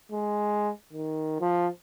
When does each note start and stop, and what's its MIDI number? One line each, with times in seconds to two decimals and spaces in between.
0.12 0.71 56
0.93 1.41 51
1.41 1.68 53